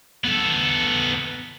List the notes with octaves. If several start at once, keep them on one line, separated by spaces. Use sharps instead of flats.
B3 A4